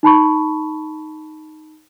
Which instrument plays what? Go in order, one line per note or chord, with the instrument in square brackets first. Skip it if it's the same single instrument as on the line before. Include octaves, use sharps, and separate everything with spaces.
[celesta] D#4 A5 B5 C#6